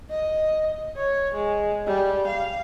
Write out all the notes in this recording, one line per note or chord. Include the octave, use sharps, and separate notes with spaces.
D#5
C#5
G#3
G3
F5